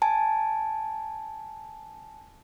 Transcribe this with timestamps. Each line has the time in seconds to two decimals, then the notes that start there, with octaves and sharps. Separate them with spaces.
0.02 G#5 A5